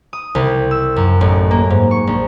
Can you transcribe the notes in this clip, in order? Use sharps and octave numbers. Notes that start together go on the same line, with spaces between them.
D#6
C2
E6
F#2
A1
A#3
G#2
C#6
A#1